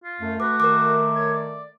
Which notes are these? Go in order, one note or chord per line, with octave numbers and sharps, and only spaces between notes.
F4
F#2 A3
F#4 B4 D6
D#3 A#4 D6
C#5
D5